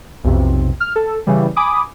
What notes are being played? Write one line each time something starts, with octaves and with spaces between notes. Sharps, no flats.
B1 F2 C3
F6
A4
C#3 E3 G3
G#5 B5 D6 D#6